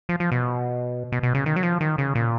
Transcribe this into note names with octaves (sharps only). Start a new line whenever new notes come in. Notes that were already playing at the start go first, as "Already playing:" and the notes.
F3
F3
B2
B2
B2
C#3
D#3
F#3
F3
D#3
C#3
A#2